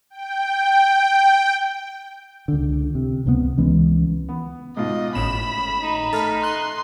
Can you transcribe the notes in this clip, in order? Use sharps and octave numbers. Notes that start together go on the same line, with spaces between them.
G5
C#2 D3
C3
C#2 C3 G#3 B3
C#2 E3 G#3 C#4
B3
G#2 B2 F4 D#5
G#1 A2 C#4 B5 E7
D#4
A3 A5 F6 B6
C6 F#6